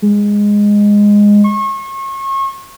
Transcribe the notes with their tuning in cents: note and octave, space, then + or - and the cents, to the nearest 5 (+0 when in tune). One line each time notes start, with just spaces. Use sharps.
G#3 -10
C#6 -35